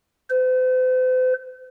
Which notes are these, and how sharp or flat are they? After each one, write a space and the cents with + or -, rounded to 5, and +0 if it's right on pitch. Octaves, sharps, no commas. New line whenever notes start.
C5 -45